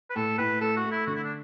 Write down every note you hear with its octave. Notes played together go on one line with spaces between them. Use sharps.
B4
A2 A4
A2 B4
A3 A4
F#4
A3
E4
D3 F#4
E4
D4